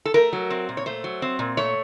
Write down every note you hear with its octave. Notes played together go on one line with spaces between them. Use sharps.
A4
A3 A#4
F#3
C4
A#2
C#5
A3 C5
F#3
C4
A#2
A3 C#5